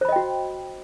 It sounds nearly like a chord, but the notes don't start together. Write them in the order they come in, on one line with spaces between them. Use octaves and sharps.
C5 B5 D#5 G5 F#4